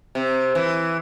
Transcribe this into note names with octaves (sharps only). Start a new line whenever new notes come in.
C3
E3